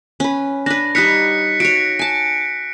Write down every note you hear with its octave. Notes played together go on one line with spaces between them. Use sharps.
C#4 B4
D4 B4 A#6
G3 D#4 C#5 F#6 B6 C#7
F#4 C#5 C#7 D7
G#5 A5